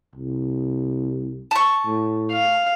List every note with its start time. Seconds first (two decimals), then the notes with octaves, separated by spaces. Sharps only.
0.16 C2
1.51 A5 C#6
1.86 A2
2.32 F5